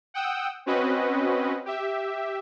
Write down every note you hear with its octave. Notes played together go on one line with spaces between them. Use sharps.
F#5 G5 D#6 E6
C4 C#4 F#4 B4 D#5
G4 E5